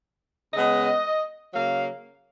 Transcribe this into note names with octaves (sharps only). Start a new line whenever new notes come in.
C#3 G#3 B3 D#5
C#3 F#3 A#3 F5